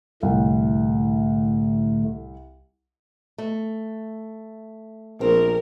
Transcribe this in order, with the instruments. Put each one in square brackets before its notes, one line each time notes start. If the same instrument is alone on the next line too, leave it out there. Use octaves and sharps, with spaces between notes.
[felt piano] C2 [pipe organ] A2 D3 A3
[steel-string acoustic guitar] A3
[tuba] A#1 [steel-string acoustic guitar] C4 [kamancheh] A#4